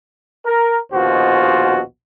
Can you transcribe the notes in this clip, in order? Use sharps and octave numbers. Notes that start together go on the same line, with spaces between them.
A#4
A#1 D#2 B2 F4 F#4 C5